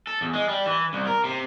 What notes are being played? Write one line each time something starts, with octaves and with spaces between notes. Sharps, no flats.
A4
E2
G#3
G3
E3
C2
A#4
C3